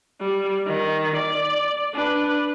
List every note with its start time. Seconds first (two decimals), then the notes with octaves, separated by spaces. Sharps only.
0.20 G3
0.66 D#3
1.16 D5
1.93 D4 B4